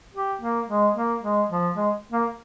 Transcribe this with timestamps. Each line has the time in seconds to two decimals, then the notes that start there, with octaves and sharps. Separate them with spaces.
0.15 G4
0.42 A#3
0.68 G#3
0.96 A#3
1.23 G#3
1.50 F3
1.76 G#3
2.12 A#3